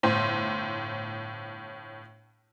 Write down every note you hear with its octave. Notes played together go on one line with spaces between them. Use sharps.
G1 A2 C5 C6